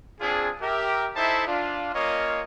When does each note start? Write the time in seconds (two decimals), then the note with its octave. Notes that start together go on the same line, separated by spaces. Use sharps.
0.20 C4 D4 F4 G#4
0.62 G4 A#4 E5
1.15 D#4 E4 A4 C5 E5 A5
1.48 D4 F4
1.95 A#3 C#4 F4 C#5 D#5